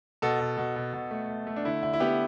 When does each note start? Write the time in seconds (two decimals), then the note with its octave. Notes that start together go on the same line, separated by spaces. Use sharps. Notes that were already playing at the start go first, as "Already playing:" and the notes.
0.22 B2 A4
0.40 B2
0.57 B2
0.76 B2
0.93 B2
1.11 A3
1.29 A3
1.47 A3
1.56 D4
1.65 D3 E4
1.83 D3 E4
1.93 E4
2.00 B3 G4